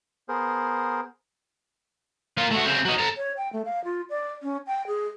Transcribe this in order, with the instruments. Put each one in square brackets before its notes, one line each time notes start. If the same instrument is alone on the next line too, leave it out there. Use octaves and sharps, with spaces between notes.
[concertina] B3 G#4 A#4 C5
[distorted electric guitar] A#3 F4
A3 F#4
C#3 C4
F#3 D#4
A4 A#5
[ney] C#5
G5
A3
F5
F4
D5
C#4
G5
G#4